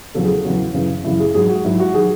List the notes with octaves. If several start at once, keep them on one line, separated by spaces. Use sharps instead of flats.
E2 C#3 F#3 A4
G#4
E2 C#3 F#3
F#2 C#3 E3
F#2 C#3 E3 E4
G#4
G#2 F#3 G#4
F#4
G#2 F#3 E4
F#4
D#3 F#3 G#4